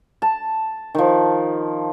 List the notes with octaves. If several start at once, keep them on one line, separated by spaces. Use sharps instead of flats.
A5
D#3 F3